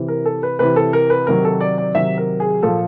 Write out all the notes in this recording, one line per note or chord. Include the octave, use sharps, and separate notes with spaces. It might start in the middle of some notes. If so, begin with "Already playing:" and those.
Already playing: C3 E3
A#4
A4
B4
C3 E3 B4
A4
A#4
B4
C3 D#3 F#3 A#4
A4
D5
D5
C3 D#3 F#3 E5
A#4
G#4
A#2 F3 A4